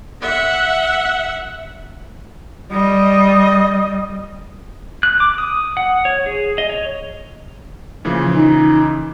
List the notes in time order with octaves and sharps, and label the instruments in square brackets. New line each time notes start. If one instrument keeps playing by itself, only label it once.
[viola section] E5 F#5
[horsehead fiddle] G3 D#5
[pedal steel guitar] F#6
D6
D#6
F#5
C#5
G#4
D#5
C#5
[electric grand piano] A#2 C#3 E3 [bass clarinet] F3
[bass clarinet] D#4